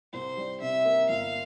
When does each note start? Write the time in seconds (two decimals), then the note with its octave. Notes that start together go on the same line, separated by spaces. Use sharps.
0.13 C2 C5
0.37 G3
0.61 C3 E5
0.85 A#3
1.09 G1 F5